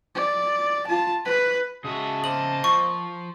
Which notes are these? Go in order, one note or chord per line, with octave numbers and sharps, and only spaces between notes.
D5
F4 A5
B4
C#3 G#3 F#4 E5 A5 D#6
A#3 C4 D#5 F#7
F3 C#6